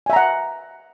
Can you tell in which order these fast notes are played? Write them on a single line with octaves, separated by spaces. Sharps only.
G#5 E5 A#5 F#5